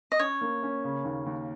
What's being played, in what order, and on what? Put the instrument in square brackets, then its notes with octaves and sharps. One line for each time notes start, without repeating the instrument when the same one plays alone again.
[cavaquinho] D#5
[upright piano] C#4 [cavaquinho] C#5
[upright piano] A#3
C#4
C#3
D#2
D#2